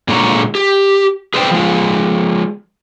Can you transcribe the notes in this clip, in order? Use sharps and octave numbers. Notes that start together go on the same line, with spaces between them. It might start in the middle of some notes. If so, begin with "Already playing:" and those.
A#2 D3 G#3 D4 C#5 A#5
G4
G#4 B4 C5 D5 G5
F3 G#3